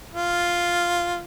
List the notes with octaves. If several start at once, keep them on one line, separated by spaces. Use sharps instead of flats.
F4